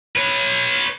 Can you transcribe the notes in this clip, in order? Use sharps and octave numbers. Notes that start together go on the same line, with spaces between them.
B4 C#5